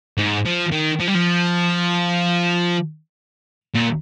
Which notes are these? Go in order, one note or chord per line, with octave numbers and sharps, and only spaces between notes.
G#2
F3
D#3
F3
G3
F3
A#2